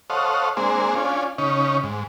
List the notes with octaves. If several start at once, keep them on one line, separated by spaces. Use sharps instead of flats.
A4 C5 C#5 D#5 F5 F#5
G#3 A#3 C4 D4 G#4 C5
C#4 D4 F4 G#5
C#3 C#4 D#4
G#2